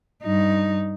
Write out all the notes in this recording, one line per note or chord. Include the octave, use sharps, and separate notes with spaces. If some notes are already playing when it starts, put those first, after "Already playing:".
G2 D#4